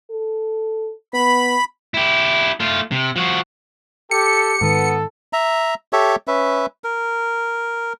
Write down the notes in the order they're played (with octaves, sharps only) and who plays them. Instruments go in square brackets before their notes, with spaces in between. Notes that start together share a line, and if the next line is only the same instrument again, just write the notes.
[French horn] A4
[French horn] B3 [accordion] B5
[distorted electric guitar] E4 G4
A3 F4
C3
F3 F#4
[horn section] G4 [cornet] A4 [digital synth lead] C#7
[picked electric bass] G#2 D#3 [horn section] B3 [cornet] A4
[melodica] E5 A#5
G4 A4 C#5 E5
C#4 B4 E5
A#4